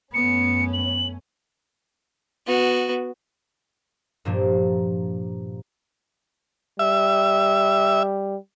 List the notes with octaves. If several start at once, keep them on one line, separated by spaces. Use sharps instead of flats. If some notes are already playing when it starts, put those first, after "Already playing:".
F#2 A3 B3 C#4 C#7
F#7
B3 F#4
G2 A#2 F3 A#3 D4
G3 E5